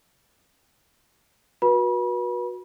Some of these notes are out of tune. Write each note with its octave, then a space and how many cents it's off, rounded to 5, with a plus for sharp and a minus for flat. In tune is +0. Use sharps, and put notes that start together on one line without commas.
F#4 -20 B4 -30 B5 -35